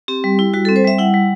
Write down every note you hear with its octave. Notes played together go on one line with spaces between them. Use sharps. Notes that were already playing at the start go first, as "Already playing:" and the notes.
C4 G4
G3
E4
G3 F#4
C4 A4
C5
G3 E5
E4 F#5
G3